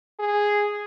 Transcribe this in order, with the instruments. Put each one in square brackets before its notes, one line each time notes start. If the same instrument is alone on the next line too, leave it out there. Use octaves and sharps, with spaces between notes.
[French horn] G#4